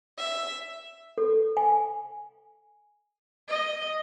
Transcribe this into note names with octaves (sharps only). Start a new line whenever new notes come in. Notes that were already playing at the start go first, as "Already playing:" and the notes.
E5
A4
G#5
D#5